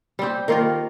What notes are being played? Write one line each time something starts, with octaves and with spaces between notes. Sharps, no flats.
G3 C4 G4
D#3 A#3 F4 A#4